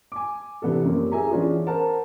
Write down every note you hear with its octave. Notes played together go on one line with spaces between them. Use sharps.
G#5 D6
C3 E3 B3 D4 A4
F#2 F3 G3 A#3 C4 C#4
G#4 E5 G#5 A#5
E3 B3 C#4 D4 F4 G#4
A#4 C5 F#5 A5